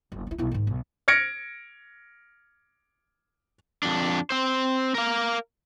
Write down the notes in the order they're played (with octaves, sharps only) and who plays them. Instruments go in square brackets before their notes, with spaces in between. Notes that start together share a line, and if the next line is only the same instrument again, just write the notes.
[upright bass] F#1
C#4 E4
B1 E4
G#2 D#3
B1
[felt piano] F6 G#6 A#6 C#7 D7
[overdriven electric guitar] F2 D4
C4 C5
A#4 F5